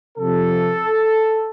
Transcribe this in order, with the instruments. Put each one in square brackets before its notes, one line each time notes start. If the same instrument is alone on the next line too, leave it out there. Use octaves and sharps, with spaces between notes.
[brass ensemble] C3 F3 A4